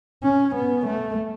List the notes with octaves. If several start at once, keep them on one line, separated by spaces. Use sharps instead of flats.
C#4
B3
A3